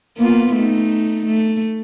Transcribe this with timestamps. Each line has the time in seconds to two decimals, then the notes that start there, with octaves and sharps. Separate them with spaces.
0.17 A#3 B3 F4
0.54 A3 D#4
1.26 A3